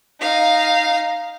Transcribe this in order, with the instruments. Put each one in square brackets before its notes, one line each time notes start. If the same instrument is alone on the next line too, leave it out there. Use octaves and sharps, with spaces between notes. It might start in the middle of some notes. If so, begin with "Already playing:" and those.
[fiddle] D#4 F5